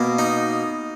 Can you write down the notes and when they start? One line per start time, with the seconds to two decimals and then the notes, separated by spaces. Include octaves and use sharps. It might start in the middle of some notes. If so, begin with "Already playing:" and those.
Already playing: B2 A#3
0.19 D#4